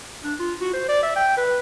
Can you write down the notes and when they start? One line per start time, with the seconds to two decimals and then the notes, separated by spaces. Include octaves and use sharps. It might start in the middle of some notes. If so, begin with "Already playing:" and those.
0.24 D4
0.39 F4
0.61 F#4
0.73 C5
0.88 D5
1.03 E5
1.16 G5
1.37 B4